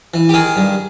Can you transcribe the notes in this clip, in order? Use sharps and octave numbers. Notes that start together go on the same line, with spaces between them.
E3
G4
D#3 G#4
G2